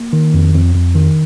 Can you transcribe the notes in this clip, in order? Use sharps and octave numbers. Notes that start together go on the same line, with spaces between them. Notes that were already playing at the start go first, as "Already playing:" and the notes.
Already playing: A#3
D#3
F2
F2
F2
D#3